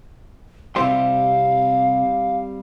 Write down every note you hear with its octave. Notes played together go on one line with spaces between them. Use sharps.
C3 G3 C4 E4 G4 F5 C6